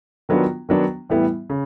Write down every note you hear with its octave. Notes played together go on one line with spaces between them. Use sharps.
D#3 F#3 B3 D4 F4
D#3 F#3 B3 D4
A2 E3 G3 B3 E4
C#3